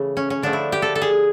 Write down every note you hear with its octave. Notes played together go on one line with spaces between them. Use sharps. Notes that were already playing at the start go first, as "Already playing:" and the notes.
Already playing: C#3 E3 A3
C#4
C#4
D3 F3 A3 D4
E4
G4
A4
A4
G#4